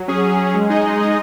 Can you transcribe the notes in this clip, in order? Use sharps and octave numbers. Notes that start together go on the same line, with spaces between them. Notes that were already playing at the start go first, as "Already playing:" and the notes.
Already playing: F#3
C#4 G#4
F#3
C#4 G#4
G#3
D#4 G#4 D#5
G#3
D#4 G#4 D#5